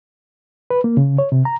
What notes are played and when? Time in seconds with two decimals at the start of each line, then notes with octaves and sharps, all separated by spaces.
0.70 B4
0.84 A#3
0.97 C#3
1.18 C#5
1.32 C3
1.45 A#5